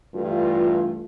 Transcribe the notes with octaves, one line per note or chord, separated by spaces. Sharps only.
G2 E3 A3 F4